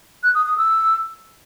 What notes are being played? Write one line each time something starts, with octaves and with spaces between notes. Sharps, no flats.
F#6
D#6
D#6
E6